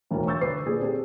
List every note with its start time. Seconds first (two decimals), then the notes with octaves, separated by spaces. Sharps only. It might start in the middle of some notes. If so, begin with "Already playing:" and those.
0.11 E1 D2 A2 A#4
0.27 C#6 E6 G6 A6
0.41 D3 D4 B4 D6 C7
0.66 A#2 G#4 A4
0.81 C4 G4 A4